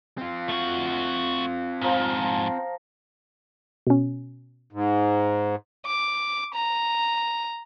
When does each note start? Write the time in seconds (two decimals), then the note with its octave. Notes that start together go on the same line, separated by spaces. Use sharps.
0.18 C4 F4
0.49 A3 F#4
1.81 F2 G#2 F3 A#4
3.87 B2 C#4
4.73 G#2
5.86 D6
6.54 A#5